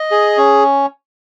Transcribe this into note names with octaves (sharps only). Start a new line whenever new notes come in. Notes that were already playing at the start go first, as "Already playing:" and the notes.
Already playing: D#5
G#4
C#4